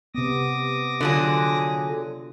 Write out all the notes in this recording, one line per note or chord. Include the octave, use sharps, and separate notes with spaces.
C3 B3 D6 D#6 A#6
D3 F#3 D4 F4 G#4